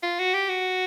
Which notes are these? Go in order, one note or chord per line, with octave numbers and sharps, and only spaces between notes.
F4
F#4
G4
F#4